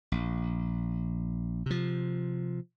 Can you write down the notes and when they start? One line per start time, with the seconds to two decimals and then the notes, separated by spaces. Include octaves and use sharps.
0.12 A#1
1.66 C3 F3